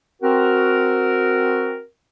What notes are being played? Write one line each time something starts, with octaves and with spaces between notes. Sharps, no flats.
C4 F#4 A#4